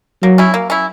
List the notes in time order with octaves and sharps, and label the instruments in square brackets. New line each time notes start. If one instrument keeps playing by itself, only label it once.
[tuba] F#3 [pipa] A#3
[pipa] C#4 E4
A#3
C#4 E4